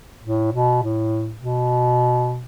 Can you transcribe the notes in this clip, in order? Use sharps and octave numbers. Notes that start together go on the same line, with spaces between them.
A2
B2
A2
B2